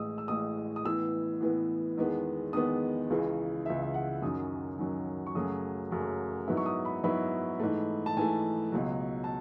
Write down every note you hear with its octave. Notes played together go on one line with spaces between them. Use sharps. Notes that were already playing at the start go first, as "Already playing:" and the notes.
Already playing: A1 A2 G#3 D#6 E6
E6
A1 A2 G#3 D#6
D#6
A2 E3 B3 E6
A2 E3 B3
E2 D#3 G#3 B3
E2 D#3 G#3 B3 D#6
C#2 C#3 E3
C#2 C#3 E3 E5
E5
F#5
F#2 D#3 F#3 C#4 D#6
F#2 D#3 F#3 C#4
C#6
F#2 C#3 F#3 A3 C#4 D#6
F#2 C#3 F#3 A3 C#4
G#2 F#3 B3 E4
C#6
D#6
B5
G#2 F#3 B3 E4 B5
G#2 E3 A3
A5
G#2 E3 A3 G#5
C#2 B2 F#3
A5